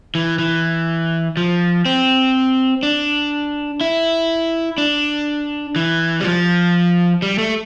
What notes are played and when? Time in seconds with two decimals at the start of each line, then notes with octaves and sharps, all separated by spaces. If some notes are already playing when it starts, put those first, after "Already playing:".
0.15 E3
0.39 E3
1.37 F3
1.86 C4
2.83 D4
3.81 E4
4.78 D4
5.76 E3
6.20 G3
6.24 F3
7.22 G3
7.38 A3